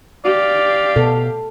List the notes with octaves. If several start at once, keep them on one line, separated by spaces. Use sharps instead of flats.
G4 D5 F5
B2 A4